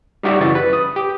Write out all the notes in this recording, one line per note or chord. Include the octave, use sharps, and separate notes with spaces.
G3 D#4 F#4 G4 E5 F#5
F#2 C#3 E3 E4 C#6 A6
B4
D#6
G4